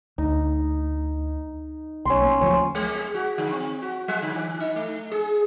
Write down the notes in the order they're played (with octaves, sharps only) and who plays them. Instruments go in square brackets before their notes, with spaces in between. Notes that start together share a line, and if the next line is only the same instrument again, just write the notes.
[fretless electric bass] D2 [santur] D#4
[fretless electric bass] B1 [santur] C#4 C6
[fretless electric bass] A#3
[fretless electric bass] D2 F3 [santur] C#4
[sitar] G#3
G#4
F#4
D3
C4
F#4
G3
D3
E3
D#4
A3
G#4